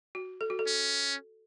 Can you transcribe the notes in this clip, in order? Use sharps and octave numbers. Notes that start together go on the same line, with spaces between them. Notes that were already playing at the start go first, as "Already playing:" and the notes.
F#4
A4
F#4
A4
C#4